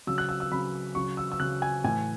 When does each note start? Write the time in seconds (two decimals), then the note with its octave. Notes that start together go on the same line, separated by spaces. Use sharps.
0.07 C#3 F#3 E6
0.18 F#6
0.29 E6
0.40 E6
0.52 C#3 F#3 B5
0.95 C#3 F#3 C#6
1.17 E6
1.32 E6
1.40 C#3 F#3 F#6
1.62 G#5
1.84 A2 E3 G#5